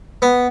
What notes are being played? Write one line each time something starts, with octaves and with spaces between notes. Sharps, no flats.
B3